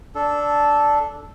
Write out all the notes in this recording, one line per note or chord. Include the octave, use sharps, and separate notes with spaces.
D4 A4